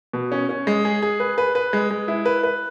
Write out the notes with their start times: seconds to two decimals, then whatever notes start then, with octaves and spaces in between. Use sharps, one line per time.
0.13 B2
0.32 C#4
0.49 C#4
0.67 G#3
0.85 G#4
1.02 G#4
1.20 B4
1.38 B4
1.55 B4
1.73 G#3
1.91 G#3
2.08 E4
2.26 B4
2.43 B4